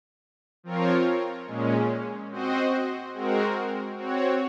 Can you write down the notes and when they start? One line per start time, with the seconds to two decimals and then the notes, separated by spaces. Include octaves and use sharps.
0.64 F3 C4 F4 A#4 C#5
1.47 A#2 G#3 C#4
2.30 C4 F#4 C5 D#5
3.14 G#3 C4 F#4 A#4
3.98 C4 F#4 C#5